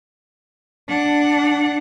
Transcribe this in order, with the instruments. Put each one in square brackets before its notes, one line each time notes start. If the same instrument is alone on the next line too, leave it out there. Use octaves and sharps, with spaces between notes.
[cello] D4 F#5